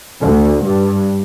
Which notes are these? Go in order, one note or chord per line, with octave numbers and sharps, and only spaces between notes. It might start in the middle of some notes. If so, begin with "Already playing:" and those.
D2
G2